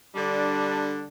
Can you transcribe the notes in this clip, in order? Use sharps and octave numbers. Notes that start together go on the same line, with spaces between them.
D3 G3 D4